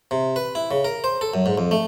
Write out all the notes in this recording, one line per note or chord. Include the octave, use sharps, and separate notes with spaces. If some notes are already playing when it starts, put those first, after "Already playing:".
C3
B4
E4
C#3
A#4
C5
A4
F#2
G#2
F2
A3